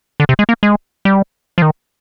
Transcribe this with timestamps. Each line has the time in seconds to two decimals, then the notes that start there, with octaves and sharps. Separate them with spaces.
0.20 D3
0.29 C3
0.39 G#3
0.49 A#3
0.63 G#3
1.05 G3
1.58 F3
1.62 D#3